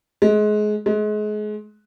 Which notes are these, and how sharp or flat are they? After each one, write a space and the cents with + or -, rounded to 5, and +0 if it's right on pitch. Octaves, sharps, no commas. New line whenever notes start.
G#3 +25
G#3 +30